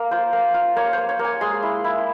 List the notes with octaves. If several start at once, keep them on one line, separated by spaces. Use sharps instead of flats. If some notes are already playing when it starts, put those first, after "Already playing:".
Already playing: A#3
F4 C5
A#3
F4
A#3 C#5
A#3 C5
C#5
A#3
G#5
G#3 C6
E4
E4